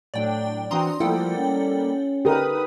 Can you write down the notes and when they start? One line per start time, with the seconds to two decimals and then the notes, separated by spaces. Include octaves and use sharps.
0.14 A2 F#3 D4 D5 G5
0.71 E3 C4 D4 F#4 A#5 C6 D#6
1.00 F3 G3 A#3 E4 A4 F#5 G5
1.37 C#4
2.25 D3 D#4 G4 A#4 B4 D#6